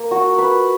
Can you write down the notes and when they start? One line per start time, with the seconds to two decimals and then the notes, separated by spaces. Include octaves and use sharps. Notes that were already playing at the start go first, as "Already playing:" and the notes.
Already playing: A#3
0.11 F#4
0.38 B4